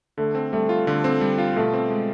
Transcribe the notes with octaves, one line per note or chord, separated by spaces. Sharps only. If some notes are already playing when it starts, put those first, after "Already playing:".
D3 A3
C4
G3 A3
F4
D3 A3
C4
G3
F4
B2 A3
C4
G#3